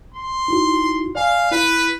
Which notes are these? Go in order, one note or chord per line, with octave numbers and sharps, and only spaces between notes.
C6
D#4 E4 F#4
D5 F5 G#5
E4 B4